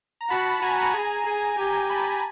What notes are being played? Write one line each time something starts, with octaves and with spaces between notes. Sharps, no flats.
A#5
F#4 A5 B5
F#4 G#5 A#5
G#5 A#5
G#4 G#5 A#5
G#4
G4 G#5 A#5
A5 B5
A5 B5
G#5 A#5